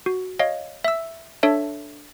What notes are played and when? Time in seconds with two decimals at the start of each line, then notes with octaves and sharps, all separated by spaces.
0.06 F#4
0.39 C#5 D#5 F5
0.84 E5 E6
1.43 D4 A4 C#5 E5 A5